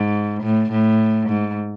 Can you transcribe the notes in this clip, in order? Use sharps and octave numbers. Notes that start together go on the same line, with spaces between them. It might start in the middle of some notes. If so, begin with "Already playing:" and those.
Already playing: G#2
A2
A2
G#2